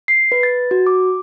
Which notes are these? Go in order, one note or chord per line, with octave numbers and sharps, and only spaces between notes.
C7
B4
A6
F#4
D6